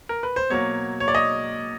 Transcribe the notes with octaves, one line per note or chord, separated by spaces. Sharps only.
A#4
B4
C5
B2 F#3 A#3 C#5
C#5
D5
D#5